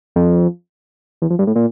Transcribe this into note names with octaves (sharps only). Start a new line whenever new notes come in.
F2
E2
F2
G2
A2
A#2